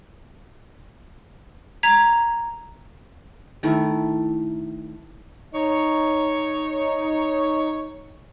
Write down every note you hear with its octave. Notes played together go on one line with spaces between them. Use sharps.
A#5 G#6 B6
D#3 A3 E4
D#4 C#5